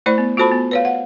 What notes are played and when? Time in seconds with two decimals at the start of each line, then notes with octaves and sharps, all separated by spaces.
0.06 A3 E4 C5 D5 B5
0.18 B3
0.37 F4 F#4 A4 C5 A5 B5
0.52 B3
0.71 B4 C#5 F5
0.85 F#5